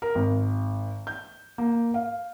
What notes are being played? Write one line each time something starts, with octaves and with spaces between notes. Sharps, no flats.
A#4
G#1
G6
A#3
F5